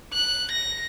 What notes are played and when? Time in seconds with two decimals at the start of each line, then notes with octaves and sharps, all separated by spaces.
0.13 F#6
0.52 A#6